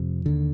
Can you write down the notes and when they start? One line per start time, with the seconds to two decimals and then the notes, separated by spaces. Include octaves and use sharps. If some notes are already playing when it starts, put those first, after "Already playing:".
Already playing: F2 C3
0.26 D#2 D3